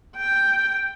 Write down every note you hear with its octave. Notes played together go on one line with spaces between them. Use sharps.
G5